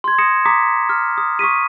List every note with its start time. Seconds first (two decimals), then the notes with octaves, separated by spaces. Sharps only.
0.04 C6 G#6
0.18 D#6 A#6 C#7 E7
0.45 A#5 D6 D#6 B6
0.89 F6
1.18 D#6
1.39 C#6 D#6 B6 D#7